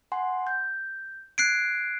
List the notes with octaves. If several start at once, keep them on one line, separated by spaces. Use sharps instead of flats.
F#5 G#5 C6
G6
F#6 G#6 C7 D7